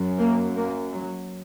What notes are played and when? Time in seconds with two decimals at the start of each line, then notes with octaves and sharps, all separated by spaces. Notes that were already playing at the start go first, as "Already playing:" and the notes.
Already playing: F#2
0.18 A#3
0.56 A#3
0.93 F#3